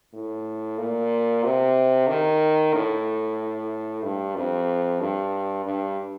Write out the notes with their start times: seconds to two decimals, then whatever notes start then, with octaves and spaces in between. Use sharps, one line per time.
0.14 A2
0.78 A#2
1.44 C3
2.08 D#3
2.74 A2
4.03 G2
4.36 F2
5.00 G2
5.65 G2